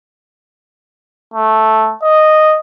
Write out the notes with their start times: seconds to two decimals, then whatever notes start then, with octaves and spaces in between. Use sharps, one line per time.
1.34 A3
2.03 D#5